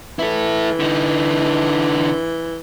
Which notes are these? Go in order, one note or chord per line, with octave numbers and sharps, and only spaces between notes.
E3 E4 A4
D3 D#4